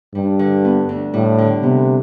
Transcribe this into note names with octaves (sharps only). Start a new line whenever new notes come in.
G2 G3
D3
B3
D2
A2 G3
D3
C3 B3